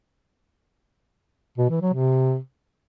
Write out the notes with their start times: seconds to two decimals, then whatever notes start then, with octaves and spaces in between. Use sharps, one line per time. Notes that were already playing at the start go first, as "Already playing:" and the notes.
1.58 B2
1.70 E3
1.82 F#3
1.94 C3